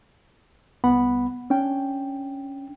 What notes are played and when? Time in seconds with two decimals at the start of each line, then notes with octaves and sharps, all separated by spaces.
0.84 C2 B3 F#5 B5
1.50 C#4 D4 G5